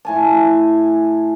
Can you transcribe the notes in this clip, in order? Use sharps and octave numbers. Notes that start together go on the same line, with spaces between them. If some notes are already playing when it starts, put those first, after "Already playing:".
A2 G#5 A5